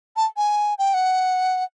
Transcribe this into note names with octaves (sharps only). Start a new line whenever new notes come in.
A5
G#5
G5
F#5